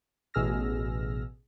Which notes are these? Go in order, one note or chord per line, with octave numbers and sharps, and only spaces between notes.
A1 B2 G#4 E6 F6 A#6